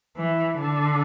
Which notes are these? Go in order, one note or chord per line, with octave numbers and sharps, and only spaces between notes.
E3
D3